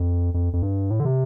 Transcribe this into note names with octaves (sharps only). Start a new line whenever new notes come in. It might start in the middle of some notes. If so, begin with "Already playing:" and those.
Already playing: F2
F2
F2
G2
A2
D3
C3